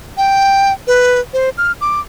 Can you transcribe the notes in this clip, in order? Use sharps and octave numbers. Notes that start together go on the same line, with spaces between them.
G5
B4
C5
F6
D6